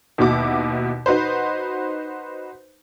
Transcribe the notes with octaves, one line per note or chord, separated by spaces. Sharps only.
D#2 B2 E4 F#4 D6
D#4 F#4 B4 C5